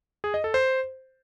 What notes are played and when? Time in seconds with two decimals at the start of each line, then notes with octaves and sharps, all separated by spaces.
0.24 G#4
0.34 D#5
0.44 A4
0.54 C5